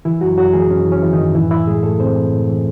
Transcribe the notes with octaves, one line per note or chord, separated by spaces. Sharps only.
E3 E4
F#2 F#3 F#4
F#2 F#3 F#4
E3 G#3 G#4
F#2 C#4
E3
C#4
E3
D#3 D#4
F#2
A2 E3 E4
E3 E4
A2 G#3 G#4
A2 A3 A4
A2 C4 C5
E3
A2
E3